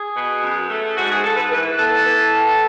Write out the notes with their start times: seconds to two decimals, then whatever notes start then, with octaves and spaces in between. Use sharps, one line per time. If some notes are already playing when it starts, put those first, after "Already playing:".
Already playing: G#4
0.15 B2
0.42 F#2
0.69 A3
0.97 G#2 F#4
1.10 G#4
1.24 G#2 A4
1.37 B4
1.51 E3 B4
1.78 B3 A4
2.05 E3
2.33 A2